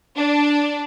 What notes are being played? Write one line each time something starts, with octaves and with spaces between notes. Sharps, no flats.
D4